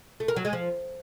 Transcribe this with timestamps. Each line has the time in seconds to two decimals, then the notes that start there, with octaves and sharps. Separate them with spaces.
0.20 A3
0.28 A#4
0.37 F#3
0.45 G#3
0.53 F3